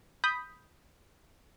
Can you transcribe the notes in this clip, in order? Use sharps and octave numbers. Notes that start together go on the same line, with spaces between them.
B5 D#6 G6 B6